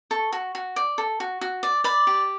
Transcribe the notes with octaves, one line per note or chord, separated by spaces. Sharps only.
A4 C#6
F#4
F#4
D5
A4
F#4
F#4
D5
D5 B5
G4